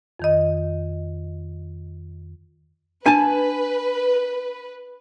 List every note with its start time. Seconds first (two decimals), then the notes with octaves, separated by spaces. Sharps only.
0.20 F2 D#3 D#5
3.06 D4 B4 G#5 A5